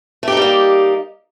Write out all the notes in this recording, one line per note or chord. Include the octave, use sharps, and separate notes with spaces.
G3 A3 A#3 D#4 G4